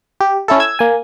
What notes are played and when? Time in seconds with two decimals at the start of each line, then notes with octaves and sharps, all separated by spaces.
0.20 G4
0.48 C#4 E4 A4
0.60 E6 G#6
0.79 A#3 G#5